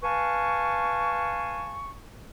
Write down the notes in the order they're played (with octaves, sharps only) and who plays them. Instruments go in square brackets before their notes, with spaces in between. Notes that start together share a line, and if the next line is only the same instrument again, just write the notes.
[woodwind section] B4 F5 G#5 A5 C#6